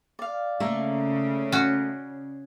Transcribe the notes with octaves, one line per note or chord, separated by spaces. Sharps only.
D5 F5
C#3 A3 A#3 A#4
C#4 F#4